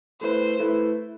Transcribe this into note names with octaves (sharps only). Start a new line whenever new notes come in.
A3 E4 B4 C5
A3 E4 B4